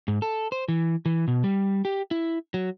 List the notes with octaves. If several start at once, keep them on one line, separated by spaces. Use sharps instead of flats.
G#2
A4
C5
E3
E3
B2
G3
G4
E4
F#3